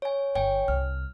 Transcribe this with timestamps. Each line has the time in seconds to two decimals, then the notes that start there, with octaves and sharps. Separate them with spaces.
0.02 C#5 G#5
0.35 G1 C#5 G5 G#5
0.68 C2 F6